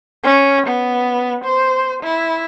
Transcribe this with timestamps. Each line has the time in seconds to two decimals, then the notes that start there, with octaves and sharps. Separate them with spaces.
0.24 C#4
0.67 B3
1.44 C5
2.03 E4